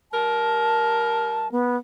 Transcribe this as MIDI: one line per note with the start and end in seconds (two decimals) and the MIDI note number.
0.12 1.55 55
0.12 1.55 70
0.12 1.48 81
1.52 1.77 59